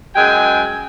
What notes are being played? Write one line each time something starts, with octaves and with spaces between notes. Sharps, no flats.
F#2 G#3 G5 G#5